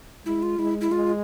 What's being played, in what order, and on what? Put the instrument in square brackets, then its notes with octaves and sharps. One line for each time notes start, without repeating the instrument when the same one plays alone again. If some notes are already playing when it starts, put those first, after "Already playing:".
[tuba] G#3 [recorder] E4
[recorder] F4
[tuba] G#3 [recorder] E4
[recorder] E4
[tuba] G#3 [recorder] F4